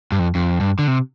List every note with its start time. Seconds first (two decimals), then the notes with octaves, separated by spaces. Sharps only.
0.12 G2
0.19 F2
0.35 F2
0.61 G2
0.79 D3
0.88 C3